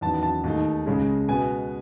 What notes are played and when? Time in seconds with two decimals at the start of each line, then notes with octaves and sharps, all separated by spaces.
0.01 E2 D#3 F#3 B3 A5
0.23 A5
0.44 D#2 D#3 A3 D#4
0.86 C#2 C#3 G#3 C#4
1.28 B2 G#3 B3 G#5